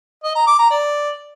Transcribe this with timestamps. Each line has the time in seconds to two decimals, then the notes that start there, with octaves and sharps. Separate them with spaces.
0.24 D#5
0.36 A#5
0.47 D6
0.59 A#5
0.71 D5